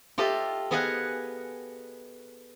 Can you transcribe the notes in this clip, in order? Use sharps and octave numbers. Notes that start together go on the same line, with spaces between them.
F4 G4 A4 D#5 E5
B3 G#4 D#5 F5 F#5 G#5